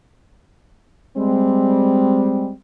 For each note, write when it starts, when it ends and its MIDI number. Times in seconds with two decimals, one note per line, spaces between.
1.17 2.51 55
1.17 2.51 56
1.17 2.51 60